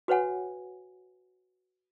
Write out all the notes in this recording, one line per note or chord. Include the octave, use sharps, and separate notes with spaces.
F#4 B4 C#5 F#5 G#5